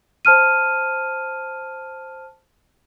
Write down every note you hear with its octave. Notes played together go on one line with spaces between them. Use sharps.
C5 A5 F6 D#7